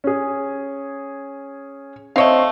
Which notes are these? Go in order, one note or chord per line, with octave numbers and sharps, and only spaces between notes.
C#4 G#4
A3 C4 C#5 D#5 F5